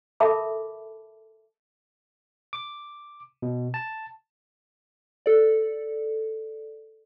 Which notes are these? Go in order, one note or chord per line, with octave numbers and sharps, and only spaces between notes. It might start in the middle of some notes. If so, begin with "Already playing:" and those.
A4 A#4 E5 A5 B5 D6
D6
B2
A5
A4 D5